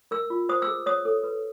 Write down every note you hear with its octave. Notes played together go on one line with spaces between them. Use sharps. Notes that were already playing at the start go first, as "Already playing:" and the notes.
A#4 E6
F4
C5 D#6
E6
G#4
C#5 D#6
A4
B4